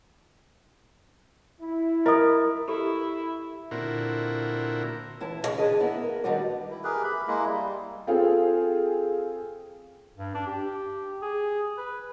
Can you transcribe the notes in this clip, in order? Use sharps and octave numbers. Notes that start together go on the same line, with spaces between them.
E4
A#4 D#5 D#6
E4 G4 A4
A#2 D3 C4 E4 F#4 A#4
E3 E4 A5
D2 C#3
D#3 D4 G#4 B4 D#5
A#3 B3 E4
A#4
D#3 G3 D4 F#4 B4 D5
E4
G4 G#4 A#4 B4
E5 B5
G#3 A#3 E4
G3
C4 F4 G#4 A4 F5 G5
G2
D4
G4
G#4
B4